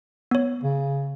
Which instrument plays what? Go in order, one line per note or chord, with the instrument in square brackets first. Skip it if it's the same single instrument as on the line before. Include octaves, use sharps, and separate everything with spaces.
[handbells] B3 C#5
[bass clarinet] C#3